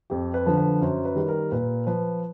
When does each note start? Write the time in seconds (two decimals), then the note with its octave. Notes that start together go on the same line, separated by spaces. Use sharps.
0.10 F2 G4
0.34 B4
0.46 D3 F3
0.57 B4
0.81 F#2 C5
1.05 B4
1.16 D#3 G3
1.28 A#4
1.52 A#2 B4
1.87 F3 B4